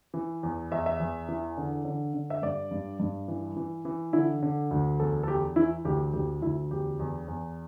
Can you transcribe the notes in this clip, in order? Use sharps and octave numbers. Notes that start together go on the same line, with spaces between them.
E3
E2
E2 E5
E5
E2
E3
D3
D3
D3
E5
G2 D5
G2
G2
E3
E3
E3
D3 E4
D3
D2
E2 A4
A4
E2 G4
E3 E4
D2 G4
D2 G4
D2 E4
E2 G4
E2
E2